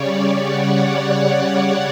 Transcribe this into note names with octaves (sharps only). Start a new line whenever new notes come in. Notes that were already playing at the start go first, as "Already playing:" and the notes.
Already playing: C#3 G3 C#5 D5
F#5
F#5